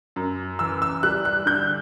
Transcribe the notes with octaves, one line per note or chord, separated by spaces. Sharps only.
F#2
E3 E6
E6
G3 F#6
F#6
D3 G6